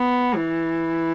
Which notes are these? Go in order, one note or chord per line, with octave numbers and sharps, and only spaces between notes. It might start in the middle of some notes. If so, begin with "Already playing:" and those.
Already playing: B3
E3